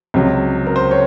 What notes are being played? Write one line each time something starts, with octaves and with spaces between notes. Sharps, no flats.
C#2 C3 F#3
A#4
C5
C#5